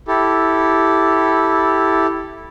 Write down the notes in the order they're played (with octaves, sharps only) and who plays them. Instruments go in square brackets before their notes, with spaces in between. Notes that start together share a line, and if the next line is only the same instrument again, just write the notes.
[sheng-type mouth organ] E4 G4 A4